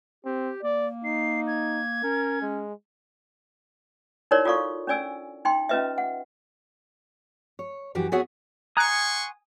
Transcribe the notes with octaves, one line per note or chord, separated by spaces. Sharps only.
C4 G4
A#3 D5
D#4 C7
G#6
C#4 A#4
G#3
D#4 E4 F#4 A#4 C#5 D5
F4 F#4 A4 D5 F5 C#6
C#4 D4 D5 G#5 E6
D#4 G5 C6
C#4 F4 B4 D#5 E5
F#5
C#5
F#2 E3 F#4 G4
B3 F#4 G#4 C#5 E5 F#5
F#5 G#5 A#5 C6 C#6 D#6 F#6